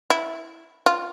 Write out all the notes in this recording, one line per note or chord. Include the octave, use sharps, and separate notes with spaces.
E4
F4